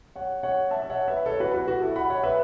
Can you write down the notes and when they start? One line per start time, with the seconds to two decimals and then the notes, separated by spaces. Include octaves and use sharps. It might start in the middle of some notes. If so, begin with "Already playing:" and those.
0.16 C#5 F#5
0.43 C#5 F#5
0.71 E5 A5
0.82 E5
0.90 C#5 F#5
1.08 B4 E5
1.26 A4 C#5
1.40 F#4 B4
1.54 F#4 B4
1.68 F#4
1.82 E4 A4
1.96 F#5 B5
2.10 C#5 F#5
2.23 B4 E5